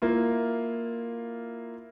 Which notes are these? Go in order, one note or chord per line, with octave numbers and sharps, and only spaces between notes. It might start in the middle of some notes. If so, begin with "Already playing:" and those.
A#3 E4 F4